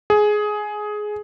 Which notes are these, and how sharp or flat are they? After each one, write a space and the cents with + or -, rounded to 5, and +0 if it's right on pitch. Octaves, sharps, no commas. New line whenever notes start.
G#4 +15